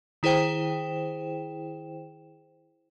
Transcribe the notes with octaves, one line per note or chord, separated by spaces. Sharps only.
D#3 E4 G#4 C5 G5 E7